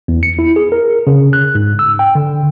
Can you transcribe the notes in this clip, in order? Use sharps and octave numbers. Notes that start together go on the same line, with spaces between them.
E2
C#7
E4
G#4
A#4
C#3
F#6
G#2
E6
G5
D3